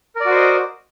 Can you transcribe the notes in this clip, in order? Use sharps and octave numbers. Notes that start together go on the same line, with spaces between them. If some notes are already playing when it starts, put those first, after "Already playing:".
F#4 A#4 C5 D5 D#5